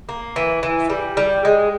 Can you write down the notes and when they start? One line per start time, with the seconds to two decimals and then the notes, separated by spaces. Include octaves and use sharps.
0.09 A#3
0.36 E3
0.63 E3
0.90 G3
1.17 G3
1.45 G#3